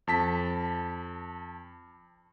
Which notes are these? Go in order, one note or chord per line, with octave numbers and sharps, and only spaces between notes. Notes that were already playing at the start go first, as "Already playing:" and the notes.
F2 A5 B6